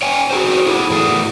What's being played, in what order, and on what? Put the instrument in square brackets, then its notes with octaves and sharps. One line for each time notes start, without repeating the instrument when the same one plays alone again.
[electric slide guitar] C#5 G5 G#5
F#4 G#4 C5
E4 G#4 A4
A2 E3 G#4